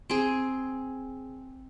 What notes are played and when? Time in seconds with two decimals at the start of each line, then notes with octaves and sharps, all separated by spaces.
0.10 C4 G#4